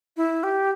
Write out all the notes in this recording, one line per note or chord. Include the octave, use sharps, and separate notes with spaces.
E4
G4